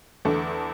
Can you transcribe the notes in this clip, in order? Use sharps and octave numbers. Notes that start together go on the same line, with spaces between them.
E2 D3 A3 D4 A4